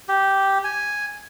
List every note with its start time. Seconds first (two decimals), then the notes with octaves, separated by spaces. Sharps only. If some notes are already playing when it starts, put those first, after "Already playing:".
0.08 G4
0.64 G#5